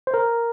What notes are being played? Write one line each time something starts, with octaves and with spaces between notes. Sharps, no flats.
C5
A#4